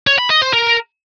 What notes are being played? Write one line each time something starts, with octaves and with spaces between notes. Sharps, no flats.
C#5
B5
D#5
C5
A#4